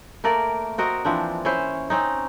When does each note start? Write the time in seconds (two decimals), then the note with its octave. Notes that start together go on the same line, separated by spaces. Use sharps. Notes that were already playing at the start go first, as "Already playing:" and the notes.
0.24 A3 A#3 A#4 D5
0.78 C4 F#4 A#4 D#5
1.05 E3 F3 C4 D4
1.45 C#4 E4 C5
1.90 C4 C#4 D#4